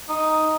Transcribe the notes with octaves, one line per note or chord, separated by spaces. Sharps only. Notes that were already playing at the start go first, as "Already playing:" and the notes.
D#4